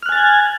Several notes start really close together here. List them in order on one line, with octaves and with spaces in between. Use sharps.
F6 F#6 G#5 A6 G#6